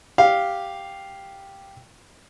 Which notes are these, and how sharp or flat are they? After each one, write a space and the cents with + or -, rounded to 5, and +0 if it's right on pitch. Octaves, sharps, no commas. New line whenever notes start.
G4 +0 F5 +0